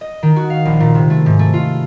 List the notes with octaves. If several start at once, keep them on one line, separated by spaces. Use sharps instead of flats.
D#5
D#3
F#4
F5
A#1
A#2
C3
A3
G#2
A3
F4